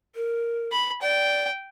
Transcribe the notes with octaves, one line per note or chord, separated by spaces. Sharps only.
A#4
B5
D5 G5